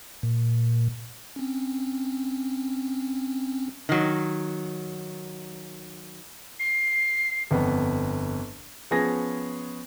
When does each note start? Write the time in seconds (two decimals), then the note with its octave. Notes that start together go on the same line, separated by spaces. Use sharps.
0.23 A#2
1.36 C4 C#4
3.89 D#3 F#3
6.59 C7
7.51 G1 F2 B3
8.91 F3 B3 C#4 G#4 A#6